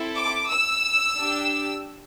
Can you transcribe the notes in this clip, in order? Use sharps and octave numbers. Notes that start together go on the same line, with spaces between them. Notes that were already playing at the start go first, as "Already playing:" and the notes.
Already playing: C4 E4 A4
D6
E6
D4 G4